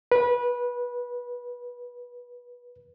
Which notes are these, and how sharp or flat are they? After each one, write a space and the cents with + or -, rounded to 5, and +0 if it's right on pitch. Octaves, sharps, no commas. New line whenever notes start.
B4 -20